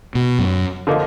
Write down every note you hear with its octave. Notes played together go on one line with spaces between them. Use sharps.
B2
F#2
D3 F3 A#3 D#4